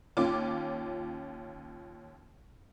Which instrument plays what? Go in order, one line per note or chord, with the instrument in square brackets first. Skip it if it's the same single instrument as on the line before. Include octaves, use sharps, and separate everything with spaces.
[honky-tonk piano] D#2 C#4 F4 D6